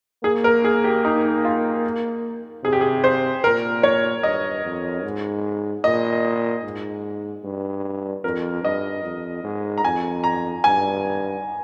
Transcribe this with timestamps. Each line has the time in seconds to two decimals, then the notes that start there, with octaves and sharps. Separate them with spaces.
0.23 A#3 G#4
0.44 A#4
0.64 G#4
0.84 G4
1.05 D#4
1.45 F4
2.64 C3 G#4
2.73 G4
2.81 G#4
3.04 C5
3.44 A#2 A#4
3.83 C#5
4.23 G2 D#5
4.64 F2
5.03 G#2
5.84 A#2 D#5
6.64 G#2
7.44 G2
8.24 F2 A#4
8.63 G2 D#5
9.04 F2
9.44 G#2
9.78 A#5
9.84 F2 G#5
10.24 A#5
10.64 G2 G#5